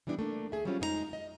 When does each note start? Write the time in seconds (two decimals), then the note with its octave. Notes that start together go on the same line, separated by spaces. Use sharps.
0.07 E3 G3 B3 D4 E4
0.19 A3 A#3 D4
0.52 D2 A3 G#4 E5
0.65 F#3 G3 C4 C#4 F4
0.80 F2 G#3 D#4 A4 A#5
1.13 D#5